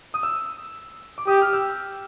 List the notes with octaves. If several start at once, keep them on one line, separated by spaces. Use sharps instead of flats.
D#6
E6
D6
G4 D#6
F6
E6